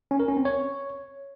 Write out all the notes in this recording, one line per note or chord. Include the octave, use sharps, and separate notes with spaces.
C#4
A#4
C#4
C4
C#5